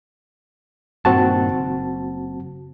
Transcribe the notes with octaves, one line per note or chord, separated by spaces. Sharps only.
G2 A#2 D#3 C4 F#4 A5
F#1